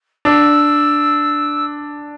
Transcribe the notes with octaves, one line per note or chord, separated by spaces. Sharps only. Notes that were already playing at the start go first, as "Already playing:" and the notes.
D4 E6